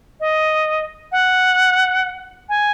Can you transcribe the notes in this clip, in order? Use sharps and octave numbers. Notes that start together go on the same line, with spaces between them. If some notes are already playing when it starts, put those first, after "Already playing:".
D#5
F#5
G#5